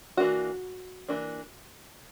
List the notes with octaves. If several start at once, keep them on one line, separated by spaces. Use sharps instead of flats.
E3 A#3 D4 F#4
E3 A#3 D4